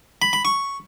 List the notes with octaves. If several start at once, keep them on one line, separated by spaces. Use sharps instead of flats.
B5
B5
C#6